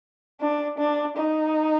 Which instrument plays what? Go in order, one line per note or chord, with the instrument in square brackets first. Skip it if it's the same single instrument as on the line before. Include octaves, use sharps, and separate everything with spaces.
[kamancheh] D4
D4
D#4